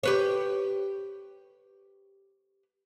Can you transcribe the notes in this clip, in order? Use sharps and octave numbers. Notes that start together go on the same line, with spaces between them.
G4 B4 C#5